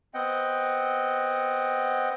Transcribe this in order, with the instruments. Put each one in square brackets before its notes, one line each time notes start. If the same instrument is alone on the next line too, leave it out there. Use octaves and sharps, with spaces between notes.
[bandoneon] B3 C4 D#5 F#5 G5